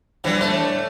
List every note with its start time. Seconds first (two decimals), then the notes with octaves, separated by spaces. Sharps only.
0.24 D3 E3 F3 G3
0.41 A2 A3 D4 C5